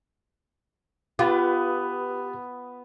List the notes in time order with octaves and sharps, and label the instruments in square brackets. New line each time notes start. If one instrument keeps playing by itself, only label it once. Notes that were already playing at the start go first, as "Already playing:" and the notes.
[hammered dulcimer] B3 [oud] F4 [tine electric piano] G4 B4